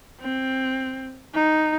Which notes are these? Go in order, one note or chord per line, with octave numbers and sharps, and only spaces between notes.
C4
D#4